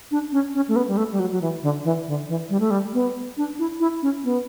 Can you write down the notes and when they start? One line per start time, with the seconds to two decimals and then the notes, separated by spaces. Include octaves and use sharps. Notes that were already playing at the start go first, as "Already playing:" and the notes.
0.11 D4
0.32 C#4
0.54 C#4
0.68 A3
0.76 B3
0.88 G3
0.97 A3
1.12 G3
1.19 F#3
1.32 F#3
1.41 E3
1.62 D3
1.84 E3
2.07 D3
2.28 E3
2.50 G3
2.60 A3
2.71 G3
2.93 B3
3.37 D4
3.59 E4
3.80 E4
4.02 C#4
4.24 B3